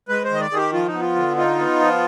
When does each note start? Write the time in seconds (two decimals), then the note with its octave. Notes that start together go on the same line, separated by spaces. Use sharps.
0.09 G#3 B4
0.24 C5
0.30 D#3 D#5
0.41 D5
0.51 D#3 G#4
0.56 G4
0.73 F3 F4
0.87 D#4
0.94 B3
1.01 F4
1.16 D3
1.37 D#4 F4
1.59 B3
1.80 F3